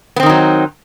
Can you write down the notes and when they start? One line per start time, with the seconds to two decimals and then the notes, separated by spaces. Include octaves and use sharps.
0.16 B3
0.20 C4
0.23 D#3
0.26 D#4
0.29 F#3